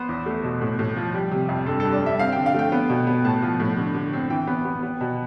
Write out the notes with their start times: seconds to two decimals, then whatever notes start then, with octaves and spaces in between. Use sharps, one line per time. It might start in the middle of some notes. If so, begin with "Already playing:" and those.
Already playing: B3 C5
0.09 E2
0.26 A3
0.44 B2
0.61 A2
0.79 A2
0.97 F3
1.14 G3
1.31 C3
1.49 F2
1.66 G2 A4
1.80 A4
1.85 G2
1.93 D5
2.01 G2 E5
2.19 C4 F5
2.32 D3 G5
2.46 F5
2.54 A3 G5
2.72 B3
2.90 B2
3.07 B3
3.25 A2 A5
3.42 F3
3.60 A2
3.77 D3
3.94 D3
4.13 C4
4.30 E3 G5
4.47 B3
4.65 B3
4.83 B3
5.01 B2